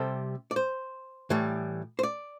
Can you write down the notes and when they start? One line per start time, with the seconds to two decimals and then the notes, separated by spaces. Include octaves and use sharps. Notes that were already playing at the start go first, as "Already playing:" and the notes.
Already playing: C3 G3 C4 A4
0.51 D5
0.56 C5
1.30 A2 E3 G3
1.99 C5
2.03 D5